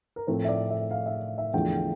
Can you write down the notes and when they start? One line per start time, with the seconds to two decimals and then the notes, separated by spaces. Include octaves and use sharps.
0.16 A#4
0.27 A2 F3 A3 C4 C5
0.45 E5
0.48 D5
0.70 E5
0.91 F5
1.06 E5
1.38 E5
1.53 E2 D3 F3 A3 G5